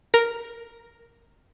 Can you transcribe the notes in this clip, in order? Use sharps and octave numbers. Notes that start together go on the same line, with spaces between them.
A#4